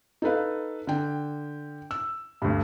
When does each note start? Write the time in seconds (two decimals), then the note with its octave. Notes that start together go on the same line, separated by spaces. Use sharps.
0.22 D#4 A4 B4 F5
0.87 D3 G5
1.91 E6
2.42 D2 G2